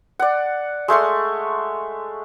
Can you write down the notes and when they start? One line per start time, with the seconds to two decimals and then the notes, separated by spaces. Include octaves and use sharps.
0.19 D5 F#5
0.88 G#3 A3 C6 C#6